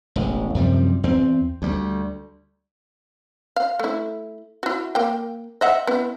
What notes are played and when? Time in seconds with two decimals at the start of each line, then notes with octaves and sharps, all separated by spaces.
0.16 E1 A1
0.55 F#2 C3 F3 G3
1.03 E2 C4
1.62 D2 G3
3.56 F5
3.79 A3 E4
4.63 E4 F#4
4.95 A#3 G5
5.61 D#5 E5 F#5
5.87 B3 E4